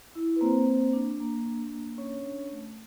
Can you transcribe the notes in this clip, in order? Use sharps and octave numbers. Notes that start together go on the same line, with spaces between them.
E4
B4
A#3 C4 C5
A#3
D4
A#3
D4
A#3
C#4 D4 C#5
D4
A3